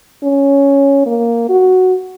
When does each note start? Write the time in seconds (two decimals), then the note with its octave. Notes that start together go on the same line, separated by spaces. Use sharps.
0.23 C#4
1.06 A#3
1.49 F#4